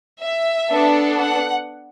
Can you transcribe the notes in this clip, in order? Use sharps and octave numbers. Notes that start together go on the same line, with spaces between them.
E5
B3 D4 A4
F#5